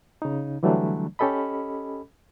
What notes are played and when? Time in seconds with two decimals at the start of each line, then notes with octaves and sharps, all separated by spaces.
0.22 C#3 D#4
0.63 D3 E3 F#3 G3 A3 D4
1.19 C#4 G4 A4 D#5 B5